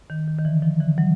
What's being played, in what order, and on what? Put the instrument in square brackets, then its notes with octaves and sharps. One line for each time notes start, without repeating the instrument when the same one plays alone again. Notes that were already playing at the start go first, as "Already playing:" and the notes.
[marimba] D#3
D#3
D#3
D3 E3
D#3 F3
D3 E3
E3 F#3